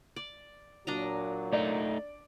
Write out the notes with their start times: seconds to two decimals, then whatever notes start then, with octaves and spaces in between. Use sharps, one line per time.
0.16 D5
0.87 A#2 F#3 D4 D#5 A#5
1.53 A3 D#4 D5